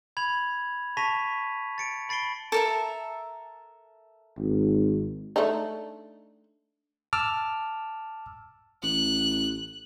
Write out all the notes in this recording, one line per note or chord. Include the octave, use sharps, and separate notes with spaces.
B5 G#6 F7 F#7
A5 C#6 A#6 B6 D#7 F7
A6 C#7 D7
B5 A6 C7 D7 G7
A4 A#4 E5
G#1
A3 D4 D#4
A5 D6 E6 F6
A1 F#6